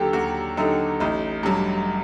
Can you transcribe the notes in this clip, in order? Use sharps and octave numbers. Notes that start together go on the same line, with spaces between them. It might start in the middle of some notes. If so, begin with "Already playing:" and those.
Already playing: D#2 D3 F#3 G4 A4
D#2 F#4
D3 F#3 D#4
A1 D#4
G2 F#3